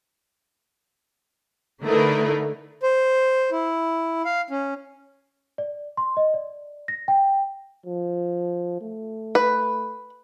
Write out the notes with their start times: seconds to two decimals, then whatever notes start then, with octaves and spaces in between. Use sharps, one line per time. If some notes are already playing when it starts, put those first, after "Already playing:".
1.82 D3 A3 D#4 E4 A#4 B4
2.83 C5
3.52 E4
4.25 F5
4.50 C#4
5.58 D5
5.97 C6
6.17 D#5
6.34 D5
6.88 A#6
7.08 G5
7.86 F3
8.81 A3
9.35 B4